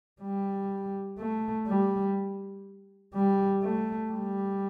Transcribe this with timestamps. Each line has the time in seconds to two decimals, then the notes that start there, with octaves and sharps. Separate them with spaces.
0.22 G3
1.19 A3
1.68 G3
3.14 G3
3.63 A3
4.11 G3